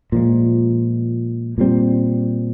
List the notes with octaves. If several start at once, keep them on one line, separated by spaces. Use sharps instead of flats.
A#2 F3 G#3
A#2 G3 C4